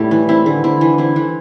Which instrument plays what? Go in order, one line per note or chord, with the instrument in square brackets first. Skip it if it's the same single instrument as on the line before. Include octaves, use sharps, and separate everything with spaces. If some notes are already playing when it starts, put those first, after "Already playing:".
Already playing: [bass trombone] A2 [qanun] G3 E4
[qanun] E3
C4 E4
[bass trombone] D3 [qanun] E3
[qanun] C4 E4
E3
C4 E4
E3